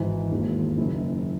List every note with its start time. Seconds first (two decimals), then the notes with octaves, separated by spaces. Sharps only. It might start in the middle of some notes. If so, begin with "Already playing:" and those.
Already playing: G#1 G#2 E3
0.31 E1 D#2 D#3
0.77 F#1 F#2 D#3 E4